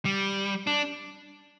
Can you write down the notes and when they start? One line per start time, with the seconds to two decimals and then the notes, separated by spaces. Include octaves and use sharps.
0.05 G3
0.67 D4